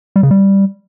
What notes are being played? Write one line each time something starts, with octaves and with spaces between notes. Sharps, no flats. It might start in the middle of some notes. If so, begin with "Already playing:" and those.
G3
C#3
G3